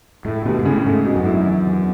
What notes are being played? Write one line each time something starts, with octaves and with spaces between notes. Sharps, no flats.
A2 A3
D#2 B2
G#2
A2 C#3
G#2 A3
B2
F#2
E4
E2
E2